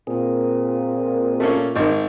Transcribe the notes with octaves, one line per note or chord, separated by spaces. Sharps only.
A#2 C4 G#4
A3 A#3 C#4
G#1 D#3